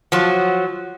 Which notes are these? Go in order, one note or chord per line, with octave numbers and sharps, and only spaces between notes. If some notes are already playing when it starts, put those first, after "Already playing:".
F3 F#3